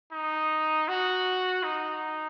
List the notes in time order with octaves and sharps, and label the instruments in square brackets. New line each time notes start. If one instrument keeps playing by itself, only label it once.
[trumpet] D#4
F#4
D#4